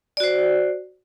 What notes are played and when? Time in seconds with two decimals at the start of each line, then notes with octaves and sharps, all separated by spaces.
0.17 D5
0.20 F#4
0.24 C5